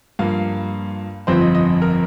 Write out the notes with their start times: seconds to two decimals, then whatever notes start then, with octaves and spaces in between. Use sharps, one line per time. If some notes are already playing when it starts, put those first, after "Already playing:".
0.19 G2 F3 A#3 F5
1.27 G1 F2 F3 C4 C5
1.41 D#5
1.55 D#5
1.82 A#4